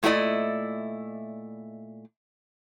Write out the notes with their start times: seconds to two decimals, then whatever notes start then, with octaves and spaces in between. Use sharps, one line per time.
0.03 A#2 A3 E4 F#4 D5 D#5